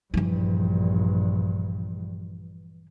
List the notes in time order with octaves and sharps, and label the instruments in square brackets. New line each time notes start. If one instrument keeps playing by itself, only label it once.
[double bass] A#1 G2 [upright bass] E3 F3